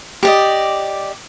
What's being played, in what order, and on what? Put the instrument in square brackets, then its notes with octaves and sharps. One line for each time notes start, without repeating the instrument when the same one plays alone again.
[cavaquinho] G4 D5 D#5